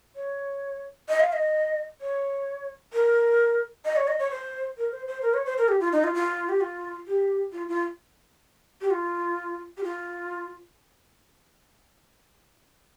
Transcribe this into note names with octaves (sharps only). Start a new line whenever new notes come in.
C#5
D#5
F5
D#5
C#5
A#4
D#5
C#5
D#5
C#5
C5
A#4
C5
C5
A#4
C#5
C5
A#4
G4
F4
D#4
F4
F4
G4
F4
G4
F4
F4
G4
F4
G4
F4